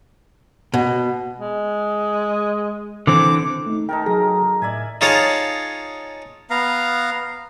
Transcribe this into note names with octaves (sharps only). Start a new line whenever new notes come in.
B2
G#3
D3 E3 C4 D6
A3 D#4
D#4 A4 A#4 G5
F#3 G#4 A#5
A2 D5 E5 G#5
D#4 F4 G#4 C#5 F5 A5
B3 F5 A#5